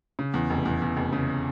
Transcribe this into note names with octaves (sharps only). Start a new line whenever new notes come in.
C#3
E2
F1
E2
E2
F1
C#3